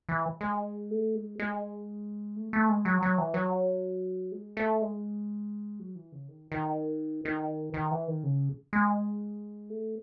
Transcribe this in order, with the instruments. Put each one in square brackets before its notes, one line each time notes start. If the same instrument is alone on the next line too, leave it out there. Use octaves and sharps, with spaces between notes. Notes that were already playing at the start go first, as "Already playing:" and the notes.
[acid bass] E3
G#3
A3
G#3
G#3
A3
A3
G#3
F#3
F#3
E3
F#3
G#3
A3
G#3
F#3
E3
C#3
D#3
D#3
D#3
D#3
E3
D#3
C#3
G#3
A3